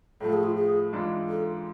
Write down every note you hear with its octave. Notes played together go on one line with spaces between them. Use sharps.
A2 F3 A3 A4
G#4
F4
G#4
G#2 E3 G#3 D4 F4
A4